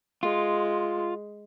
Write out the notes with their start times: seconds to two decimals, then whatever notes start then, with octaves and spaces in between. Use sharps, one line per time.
0.23 G#3 F4